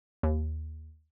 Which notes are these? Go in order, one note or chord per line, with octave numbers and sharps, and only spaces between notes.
D#2